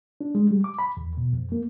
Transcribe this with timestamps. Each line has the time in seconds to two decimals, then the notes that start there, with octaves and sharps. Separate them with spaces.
0.21 D4
0.35 G#3
0.51 G3
0.64 D6
0.79 B5
0.97 E2
1.17 B2
1.33 F2
1.52 A#3